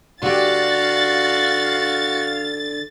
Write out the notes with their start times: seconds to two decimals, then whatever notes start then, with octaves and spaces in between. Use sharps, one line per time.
0.23 D3 F#4 G4 F5 A6